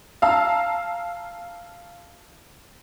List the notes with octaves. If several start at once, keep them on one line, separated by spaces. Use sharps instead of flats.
F5 A5 A#5 E6